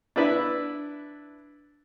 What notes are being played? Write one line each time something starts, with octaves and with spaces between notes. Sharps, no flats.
D4 E4 B4 E5